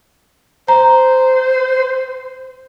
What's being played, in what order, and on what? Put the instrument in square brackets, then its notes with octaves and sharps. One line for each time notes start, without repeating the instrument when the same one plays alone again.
[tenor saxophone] C5 [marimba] A#5